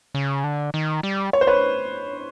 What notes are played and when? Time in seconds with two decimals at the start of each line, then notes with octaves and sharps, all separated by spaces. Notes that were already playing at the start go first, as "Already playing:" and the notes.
0.15 C#3
0.44 D3
0.74 D#3
1.03 G3
1.33 C#5
1.41 C5
1.47 B4 C#5